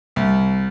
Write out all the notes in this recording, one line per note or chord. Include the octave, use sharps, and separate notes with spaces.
C2